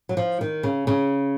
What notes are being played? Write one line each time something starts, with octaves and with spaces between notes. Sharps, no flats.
F#3
F3
D#3
C#3
C#3